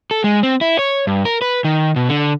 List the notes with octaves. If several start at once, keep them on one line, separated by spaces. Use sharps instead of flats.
A4
G#3
C4
E4
C#5
G2
A#4
B4
D#3
B2
D3